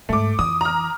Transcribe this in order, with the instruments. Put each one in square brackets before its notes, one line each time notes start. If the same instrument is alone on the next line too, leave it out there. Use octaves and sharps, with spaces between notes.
[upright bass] D2 G#2 [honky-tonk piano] A3 D6
[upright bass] F2 E3 [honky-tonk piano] D#6
[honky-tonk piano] A#5 F6